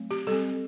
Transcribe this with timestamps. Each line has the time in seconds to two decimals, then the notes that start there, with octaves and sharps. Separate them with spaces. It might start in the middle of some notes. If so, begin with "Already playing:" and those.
Already playing: F#3 A3 C4
0.11 G4
0.27 G3 C4 A4